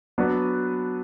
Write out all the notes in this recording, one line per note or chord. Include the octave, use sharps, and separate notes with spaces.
F#3 B3 D4 F#4 B4